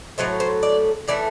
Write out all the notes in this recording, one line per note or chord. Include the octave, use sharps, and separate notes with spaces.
A2 F#3 A3 C5
C5
D5
A2 E3 A3 D5